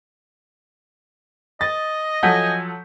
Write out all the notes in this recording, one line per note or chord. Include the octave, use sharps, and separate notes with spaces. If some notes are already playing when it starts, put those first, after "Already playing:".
D#5 A6
F3 F#3 A4 F#5 G#5 G6 B6